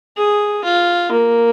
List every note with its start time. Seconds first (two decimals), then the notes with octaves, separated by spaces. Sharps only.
0.17 G#4
0.64 F4
1.12 A#3